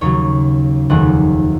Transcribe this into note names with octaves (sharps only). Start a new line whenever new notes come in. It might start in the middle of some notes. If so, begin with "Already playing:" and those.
D#2 C#3 F#3 C#5
F1 D#2 D#3 G#3 F#5